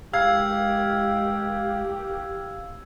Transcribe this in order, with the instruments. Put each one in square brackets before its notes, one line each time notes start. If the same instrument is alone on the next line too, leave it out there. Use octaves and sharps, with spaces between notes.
[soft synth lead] G#3 [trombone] G4 [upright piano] F5 [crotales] E6 G#6